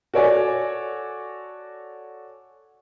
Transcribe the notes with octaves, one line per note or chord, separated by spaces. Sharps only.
F#4 A4 C#5 D5 G#5